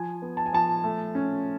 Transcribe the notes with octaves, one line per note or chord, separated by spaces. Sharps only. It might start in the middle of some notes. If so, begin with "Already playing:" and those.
Already playing: F3 G#5
B3
A5
G#5
F3 A5
A3
C#4